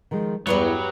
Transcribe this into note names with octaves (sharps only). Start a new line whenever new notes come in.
D#3 F3 G#3
E2 G2 F#3 G3 B3 C#5